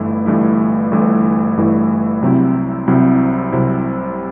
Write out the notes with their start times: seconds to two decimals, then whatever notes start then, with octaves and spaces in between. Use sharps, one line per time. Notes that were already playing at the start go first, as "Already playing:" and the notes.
Already playing: G1 G2 E3 A3 E4
0.26 G1 G2 E3 A3 E4
0.92 G1 G2 E3 A3 E4
1.57 G1 G2 E3 A3 E4
2.22 C2 C3 F#3 C4 E4
2.87 C2 C3 F#3 C4 E4
3.52 C2 C3 F#3 C4 E4